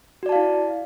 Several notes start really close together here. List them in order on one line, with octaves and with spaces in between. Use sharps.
F#4 D5 A5 F5 E4